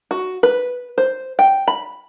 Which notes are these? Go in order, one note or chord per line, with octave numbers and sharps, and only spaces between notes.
F#4
B4
C5
G5
B5